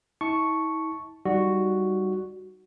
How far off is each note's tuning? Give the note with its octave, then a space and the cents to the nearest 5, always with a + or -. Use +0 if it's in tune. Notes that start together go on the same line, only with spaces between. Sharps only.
E4 -45 A5 -5 C#6 +0
G3 -10 D#4 +0 F#4 +0